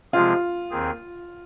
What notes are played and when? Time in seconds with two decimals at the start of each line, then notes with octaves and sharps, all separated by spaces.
0.13 C3 F3 G#3 C4 F4 G#4
0.71 D#2 D#3 C4 G#4